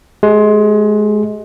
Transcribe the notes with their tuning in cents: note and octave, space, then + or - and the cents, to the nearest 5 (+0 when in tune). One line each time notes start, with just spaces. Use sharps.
G#3 +25 G4 +0